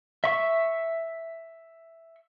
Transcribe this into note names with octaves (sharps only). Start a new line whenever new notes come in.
E5 C#6